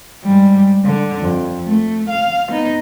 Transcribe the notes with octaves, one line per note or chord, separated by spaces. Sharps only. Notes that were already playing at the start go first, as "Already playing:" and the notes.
G#2 G3
D3
F2
A3
F5
B3 D#4